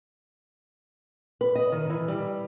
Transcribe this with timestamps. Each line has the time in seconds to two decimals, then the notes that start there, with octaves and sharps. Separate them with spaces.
1.41 B4
1.55 D#5
1.72 D#3
1.90 E3
2.08 G3